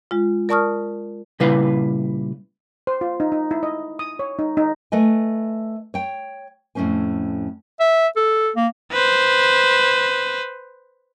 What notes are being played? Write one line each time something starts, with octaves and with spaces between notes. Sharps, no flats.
G#3 F4
A#4 D5 A5 C#6 D#6 F6
A#2 C#3 G3 E4 B4 F5
C5
F4
D#4
D#4
E4
D#5
D#6
C#5
D#4
D#4
A3 B4 D#5 G#5
C#5 G5
F2 A2 F3 C#4 C5 G#5
E5
A4
A#3
B4 C5